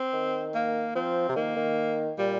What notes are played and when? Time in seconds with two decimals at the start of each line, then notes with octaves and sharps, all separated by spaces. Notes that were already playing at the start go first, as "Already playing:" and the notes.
Already playing: C4
0.13 D#3
0.54 A#3
0.95 F3 C4
1.29 C3
1.36 D#3 A#3
1.56 D#3
2.18 A#2 G3